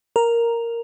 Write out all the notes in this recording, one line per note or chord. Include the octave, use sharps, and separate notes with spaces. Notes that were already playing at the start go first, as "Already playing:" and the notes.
A#4